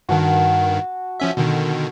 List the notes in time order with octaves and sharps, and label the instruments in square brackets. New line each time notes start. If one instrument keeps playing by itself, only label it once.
[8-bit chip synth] G2 D#3 [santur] F#4 A5
[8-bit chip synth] F3 C#4 E5
B2 D3 D#3